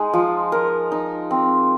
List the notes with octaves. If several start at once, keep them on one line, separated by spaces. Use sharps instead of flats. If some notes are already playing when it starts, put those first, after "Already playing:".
Already playing: G#3 D#4
F3
A#4
D#4
C4